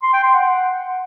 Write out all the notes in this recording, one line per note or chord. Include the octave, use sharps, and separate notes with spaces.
C6
G5
C6
F#5